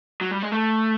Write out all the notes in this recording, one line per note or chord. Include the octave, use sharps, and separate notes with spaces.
F#3
G3
G#3
A3